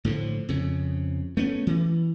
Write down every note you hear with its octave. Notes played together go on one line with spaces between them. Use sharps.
A2 D3 D#3 F3
F2 C#3
A3 B3 C#4
E3